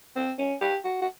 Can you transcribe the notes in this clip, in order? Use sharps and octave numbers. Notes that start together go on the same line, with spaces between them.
C4
C#4
G4
F#4
F#4